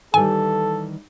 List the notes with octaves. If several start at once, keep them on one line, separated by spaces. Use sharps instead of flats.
D#3 E3 G3 A4 G#5